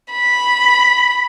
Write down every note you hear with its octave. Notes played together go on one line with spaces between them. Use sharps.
B5